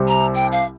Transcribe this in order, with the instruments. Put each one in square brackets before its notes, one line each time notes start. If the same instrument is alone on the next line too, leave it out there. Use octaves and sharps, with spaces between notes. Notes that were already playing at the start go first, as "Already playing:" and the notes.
Already playing: [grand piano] C2 C3 G3 C4
[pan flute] A#5
G5
F5